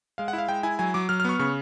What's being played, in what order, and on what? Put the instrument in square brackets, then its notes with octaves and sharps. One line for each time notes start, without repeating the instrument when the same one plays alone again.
[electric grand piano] G#3 F5
F#5
E4
F5
G#3 G5
E4 G#5
F#3 G#5
F#3 D6
F#3 F6
F6
B3 C#6
C#3 C#6